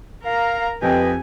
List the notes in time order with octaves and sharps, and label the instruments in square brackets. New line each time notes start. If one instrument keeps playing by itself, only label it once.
[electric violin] A#4 A#5 [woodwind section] F5
[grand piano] F2 G4 [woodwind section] B4 D#5 G5 [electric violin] G#5